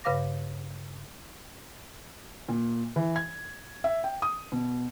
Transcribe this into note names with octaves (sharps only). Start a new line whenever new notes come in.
G2 C#3 B4 F5 D6 A#6
A#2
E3
G#6
E5
G5
D#6
B2